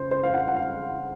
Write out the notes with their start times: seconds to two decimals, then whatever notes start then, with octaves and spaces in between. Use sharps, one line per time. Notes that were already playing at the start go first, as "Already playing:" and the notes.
Already playing: C#3 C5
0.11 C5
0.23 F5
0.34 F#5
0.48 F#5
0.56 F5